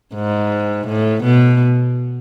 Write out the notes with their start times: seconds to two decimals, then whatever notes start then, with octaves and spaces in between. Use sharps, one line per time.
0.14 G#2
0.87 A2
1.24 B2